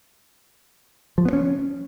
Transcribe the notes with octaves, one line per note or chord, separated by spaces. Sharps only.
F3
B3
C#4